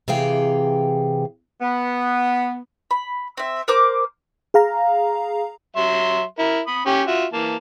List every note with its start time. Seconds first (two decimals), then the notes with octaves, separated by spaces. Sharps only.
0.08 C3 E3 G#4 F5 G5
1.61 B3
2.91 B5
3.37 C4 E5
3.68 A#4 C5 D6
4.54 G#4 F5 A#5
5.76 F#3 E5 C6
6.39 E4 A#4
6.67 B5 D#6
6.86 C#4 G4
7.07 F4 F#4 E5
7.33 E3 A#3 A5